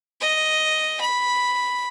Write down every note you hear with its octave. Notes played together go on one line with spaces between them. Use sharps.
D#5
B5